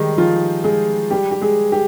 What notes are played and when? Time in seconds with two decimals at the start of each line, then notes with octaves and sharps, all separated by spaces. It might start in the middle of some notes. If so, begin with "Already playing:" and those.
Already playing: D#3 G3 G#3 D#4 G4 G#4
0.18 F3 F4
0.64 G#3 G#4
1.11 G3 G4
1.31 G4
1.41 G#3 G#4
1.72 G4